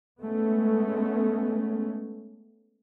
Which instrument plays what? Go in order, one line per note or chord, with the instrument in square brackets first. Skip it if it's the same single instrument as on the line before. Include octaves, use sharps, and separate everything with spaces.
[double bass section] G#3 A3 B3 C#4